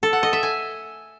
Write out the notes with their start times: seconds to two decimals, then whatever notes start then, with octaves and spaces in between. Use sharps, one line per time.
0.03 A4
0.13 F#5
0.23 D#5
0.33 E5
0.43 G#5